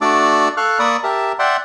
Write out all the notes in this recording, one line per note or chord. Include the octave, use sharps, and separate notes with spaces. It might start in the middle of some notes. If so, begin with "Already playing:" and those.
A3 D4 F#4 D5 D6 E6
A4 F5 C#6 F6 F#6
A#3 D5 B5 C#6 D#6 E6
G4 A#4 E5 A5
D5 E5 F#5 G5 C6